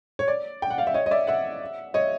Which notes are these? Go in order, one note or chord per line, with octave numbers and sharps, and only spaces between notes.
C#5
D5
G5
F#5
F5
E5
C#5 D#5
D#5
D5 E5
E5 F#5
C#5 D#5